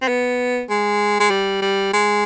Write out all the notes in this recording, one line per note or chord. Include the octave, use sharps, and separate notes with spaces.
C4
B3
G#3
G#3
G3
G3
G#3